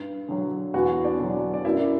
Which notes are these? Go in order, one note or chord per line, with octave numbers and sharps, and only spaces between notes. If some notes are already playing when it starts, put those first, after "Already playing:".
Already playing: G2
D3 F#3
E2 F#4 F#5
D4 D5
D3 F#3
D5
F#2 E4 E5